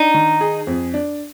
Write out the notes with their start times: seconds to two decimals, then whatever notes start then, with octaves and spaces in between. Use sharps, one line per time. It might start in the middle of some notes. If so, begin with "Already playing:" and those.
Already playing: D4 D#4
0.14 D#3
0.41 G#4
0.67 F2
0.94 D4